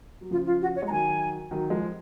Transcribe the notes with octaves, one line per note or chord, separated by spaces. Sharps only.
F#3
C#3 F3 F4
F4
F#4
C#5
G#3
A#5
D#3 F#3 G#5
D#3 F#3
F3 G#3